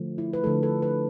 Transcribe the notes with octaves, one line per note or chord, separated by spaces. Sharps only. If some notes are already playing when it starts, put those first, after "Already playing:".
Already playing: D3 F3 A3
E4
B4
D3 F3 A3 A4
A4
B4